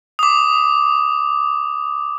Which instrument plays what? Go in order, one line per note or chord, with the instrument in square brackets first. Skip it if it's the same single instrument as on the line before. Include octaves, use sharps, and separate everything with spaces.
[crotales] D6 D#6